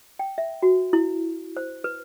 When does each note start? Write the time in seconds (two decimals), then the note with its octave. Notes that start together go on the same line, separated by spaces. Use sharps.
0.19 G5
0.38 E5
0.63 F#4
0.93 E4
1.57 C5
1.84 B4